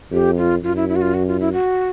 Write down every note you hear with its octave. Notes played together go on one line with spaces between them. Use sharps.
F2 G4
F4
F#2 F4
E4
E4
F#4
F4
F#4
F4
E4
F#4